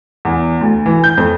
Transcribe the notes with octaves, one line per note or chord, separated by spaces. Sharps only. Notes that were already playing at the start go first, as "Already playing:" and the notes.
E2
D2
E3
G6
F2